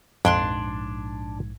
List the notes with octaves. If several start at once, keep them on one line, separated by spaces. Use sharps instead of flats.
A#1 F2 G#2 D4 C6 F#6 G#6